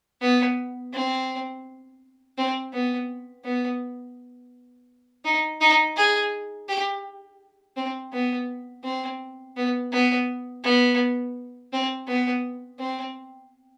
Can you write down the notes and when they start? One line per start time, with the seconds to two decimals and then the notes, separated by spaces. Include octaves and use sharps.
0.21 B3
0.94 C4
2.38 C4
2.74 B3
3.45 B3
5.25 D#4
5.61 D#4
5.97 G#4
6.69 G4
7.77 C4
8.13 B3
8.84 C4
9.57 B3
9.92 B3
10.64 B3
11.73 C4
12.08 B3
12.80 C4